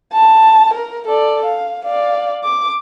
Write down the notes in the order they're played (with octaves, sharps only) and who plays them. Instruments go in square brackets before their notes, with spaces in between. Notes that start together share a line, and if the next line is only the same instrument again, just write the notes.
[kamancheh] A5
A#4
A4 D5
F5
D5 F5
D6